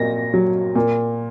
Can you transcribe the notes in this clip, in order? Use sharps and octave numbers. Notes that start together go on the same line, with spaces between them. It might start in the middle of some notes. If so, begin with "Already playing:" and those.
Already playing: A#2 F#3 A#6
F#3
A#2